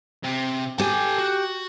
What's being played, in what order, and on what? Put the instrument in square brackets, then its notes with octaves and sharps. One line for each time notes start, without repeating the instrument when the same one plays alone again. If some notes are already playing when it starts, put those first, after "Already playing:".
[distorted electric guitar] C3
[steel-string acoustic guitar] G4 G5 [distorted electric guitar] A4 G#5
[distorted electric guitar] F#4